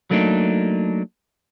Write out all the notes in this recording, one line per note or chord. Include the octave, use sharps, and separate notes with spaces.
F#3 A3 A#3 D4 D#4